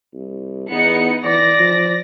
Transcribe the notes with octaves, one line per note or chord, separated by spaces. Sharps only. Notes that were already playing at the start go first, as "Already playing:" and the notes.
C2
E2 B3 D#4 C#7
E3 D5 A#6
F3